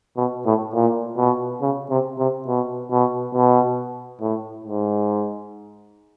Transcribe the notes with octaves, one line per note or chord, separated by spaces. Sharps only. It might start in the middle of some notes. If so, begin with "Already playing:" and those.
B2
A2
A#2
B2
C#3
C3
C3
B2
B2
B2
A2
G#2